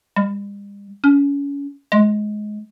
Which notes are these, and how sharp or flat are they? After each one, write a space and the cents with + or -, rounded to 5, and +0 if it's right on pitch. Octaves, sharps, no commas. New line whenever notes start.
G3 +45
C#4 +30
G#3 +20